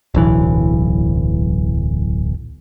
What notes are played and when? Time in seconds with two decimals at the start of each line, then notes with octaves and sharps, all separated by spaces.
0.15 D1 B1 E3